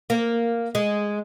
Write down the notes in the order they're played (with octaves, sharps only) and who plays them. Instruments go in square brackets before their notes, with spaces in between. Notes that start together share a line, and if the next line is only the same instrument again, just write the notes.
[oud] A#3
G#3